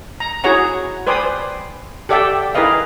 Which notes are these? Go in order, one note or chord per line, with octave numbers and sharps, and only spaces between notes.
A#5
E4 F#4 G#4 C#5 F#5 A#5
B4 C5 D5 G5 G#5 D#6
G4 A4 D5 E5 F#5 G5
E4 G#4 A#4 B4 D#5 F5